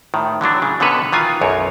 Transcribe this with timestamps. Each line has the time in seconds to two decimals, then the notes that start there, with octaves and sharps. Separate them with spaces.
0.14 A2 D#3
0.41 D3 E3 F#3 D4
0.62 C#3
0.80 B2 D3 D#3 A4 B4 C#5
1.13 D#3 E3 F4 G#5
1.41 B1 F#2 C#5